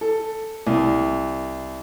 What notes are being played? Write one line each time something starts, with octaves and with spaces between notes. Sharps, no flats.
A4
C2